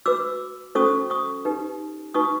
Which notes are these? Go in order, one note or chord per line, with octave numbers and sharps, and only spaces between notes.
F#4 B4 D6 E6
C#4 F#4 A4 C5 C#6 D#6
C#6 D#6
D#4 G4 B4
D#4 F#4 B4 C#6 D#6